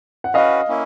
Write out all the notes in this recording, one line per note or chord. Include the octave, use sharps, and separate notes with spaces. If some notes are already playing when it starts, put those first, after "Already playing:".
F#5
C#4 F#4 B4 D#5 F5
A#3 C#4 E4